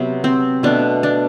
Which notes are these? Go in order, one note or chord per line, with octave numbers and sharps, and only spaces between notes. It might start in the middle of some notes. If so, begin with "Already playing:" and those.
Already playing: C3 F#3 B3
C4
B2 A3 D4
D4